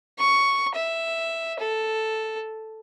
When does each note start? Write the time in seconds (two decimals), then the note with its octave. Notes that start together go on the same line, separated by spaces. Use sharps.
0.19 C#6
0.75 E5
1.59 A4